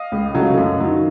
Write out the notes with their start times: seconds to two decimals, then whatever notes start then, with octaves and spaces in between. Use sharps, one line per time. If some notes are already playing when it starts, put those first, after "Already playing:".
Already playing: D#5 F5
0.12 C#2
0.34 C#3 F#3 A3
0.58 F#2
0.80 D#3 F#3